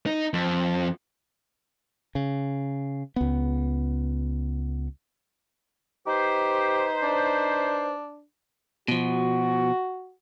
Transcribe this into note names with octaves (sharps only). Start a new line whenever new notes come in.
D#4
F2
C#3
C#2 B3
D#4 G4 B4 C5
D4
B2 F3 F#4